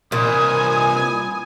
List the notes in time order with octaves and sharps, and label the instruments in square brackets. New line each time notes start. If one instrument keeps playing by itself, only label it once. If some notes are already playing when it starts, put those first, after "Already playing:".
[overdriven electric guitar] C2 E3 [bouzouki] A#2 [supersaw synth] G#5 [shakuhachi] D#6